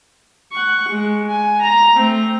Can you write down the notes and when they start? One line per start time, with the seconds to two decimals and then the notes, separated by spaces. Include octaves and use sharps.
0.52 F#5 C#6
0.88 G#3
1.29 G#5
1.61 A#5
1.95 A3 C4